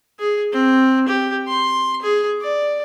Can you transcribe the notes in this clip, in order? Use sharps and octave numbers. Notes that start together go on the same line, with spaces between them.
G#4
C4
G4
C6
G#4
D5